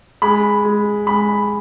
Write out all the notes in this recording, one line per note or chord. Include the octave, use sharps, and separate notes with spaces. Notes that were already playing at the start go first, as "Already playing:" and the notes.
G#3 B5
G#3
G#3 B5